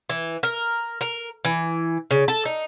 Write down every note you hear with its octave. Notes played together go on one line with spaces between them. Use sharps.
E3
A#4
A#4
E3
C#3
A4
D#4